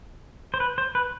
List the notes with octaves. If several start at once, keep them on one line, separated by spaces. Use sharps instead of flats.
C5
B4
C5
B4